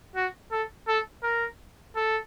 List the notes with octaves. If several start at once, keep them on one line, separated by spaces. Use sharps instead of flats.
F#4
A4
A4
A#4
A4